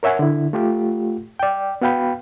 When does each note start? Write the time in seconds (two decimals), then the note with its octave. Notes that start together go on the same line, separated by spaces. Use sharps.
0.03 A#4 C#5 E5 F#5 G#5
0.19 D3 E4
0.53 A3 F4 G4
1.39 D5 G5
1.81 B3 F#4 F5 G5 B5